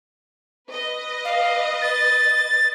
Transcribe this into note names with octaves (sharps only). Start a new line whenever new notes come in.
B4 D#5
F5
A6